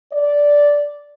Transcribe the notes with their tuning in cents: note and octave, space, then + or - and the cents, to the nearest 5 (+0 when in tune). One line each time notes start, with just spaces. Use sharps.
D5 -10